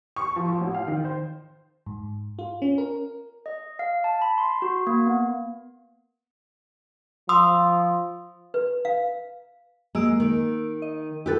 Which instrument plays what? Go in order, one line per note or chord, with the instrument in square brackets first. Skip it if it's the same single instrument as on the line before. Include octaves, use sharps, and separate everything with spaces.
[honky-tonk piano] C#6
F3
F3
A1
F5
D#3
C5
[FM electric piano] G#2
F4
C#4
A#4
[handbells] D#5
F5
A5
B5
C6
F#4
A#3
B3
[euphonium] F3 [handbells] C6 D#6 E6
[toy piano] B4
F5
[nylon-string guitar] G#3 [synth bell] A#3 E6 D7
[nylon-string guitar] D#3
[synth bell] D#5
[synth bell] E4 F#4 A4 [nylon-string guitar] G4 B4